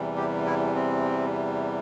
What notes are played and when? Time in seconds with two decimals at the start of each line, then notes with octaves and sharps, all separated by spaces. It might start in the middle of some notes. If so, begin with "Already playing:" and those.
Already playing: E2 C3 E3 G3
0.17 G4
0.46 E4
0.75 C4